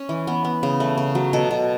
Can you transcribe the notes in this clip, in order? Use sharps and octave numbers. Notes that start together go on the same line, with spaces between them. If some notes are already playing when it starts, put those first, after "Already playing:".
Already playing: C#4
E3
B3
B3
C#3
A3
C#3
F#3
B2 A4
B2